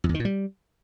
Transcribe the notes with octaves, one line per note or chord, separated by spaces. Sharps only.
F2
E2
D#3
A#2
G3